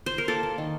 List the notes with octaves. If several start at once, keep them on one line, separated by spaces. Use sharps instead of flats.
C5
A#4
A#3 A4
A#3
D#3